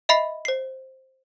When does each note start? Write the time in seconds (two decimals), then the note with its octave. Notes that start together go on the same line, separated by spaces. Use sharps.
0.09 D#5 E5 B5 C7
0.45 C5 C7